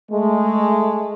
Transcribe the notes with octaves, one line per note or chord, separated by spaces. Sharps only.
G#3 A3